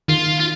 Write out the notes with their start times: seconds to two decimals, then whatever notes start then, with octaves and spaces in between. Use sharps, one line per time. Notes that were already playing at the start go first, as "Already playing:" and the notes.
0.08 D#3 F4
0.39 F4